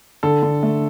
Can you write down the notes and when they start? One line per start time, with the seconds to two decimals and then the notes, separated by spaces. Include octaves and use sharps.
0.23 D3 A4
0.43 D3
0.63 A3